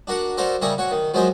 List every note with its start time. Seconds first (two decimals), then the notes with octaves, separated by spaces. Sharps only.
0.07 D4 F#4 A#4 F#5
0.37 F#4 A4 A#4 C5 D5 F5
0.61 C#3 G3 E4 A#4 C#5 D#6
0.78 F#4 C#5
0.91 D#3
1.14 F3 F#3 G#3 C#4 A#4 C5